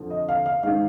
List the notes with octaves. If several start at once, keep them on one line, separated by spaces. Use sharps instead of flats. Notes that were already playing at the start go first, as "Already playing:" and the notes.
Already playing: F2 D3 F3
D#5
F5
F5
G#2 D#3 F5